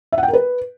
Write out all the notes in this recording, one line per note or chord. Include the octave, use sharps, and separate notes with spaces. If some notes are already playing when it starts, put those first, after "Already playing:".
E5
F#5
G5
A#4
B4